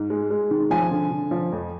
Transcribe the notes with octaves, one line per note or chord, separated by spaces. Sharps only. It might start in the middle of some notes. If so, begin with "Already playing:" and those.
Already playing: G#2
G#3
G#3
D#3
F3 G#5
D3
D3
F3
F2